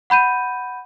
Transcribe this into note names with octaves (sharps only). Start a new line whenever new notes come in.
F#5 B5 G6 D#7